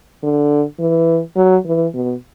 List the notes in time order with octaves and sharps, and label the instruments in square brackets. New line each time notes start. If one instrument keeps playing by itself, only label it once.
[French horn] D3
E3
F#3
E3
B2